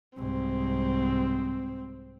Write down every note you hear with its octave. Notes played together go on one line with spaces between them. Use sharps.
C2 G#2 C4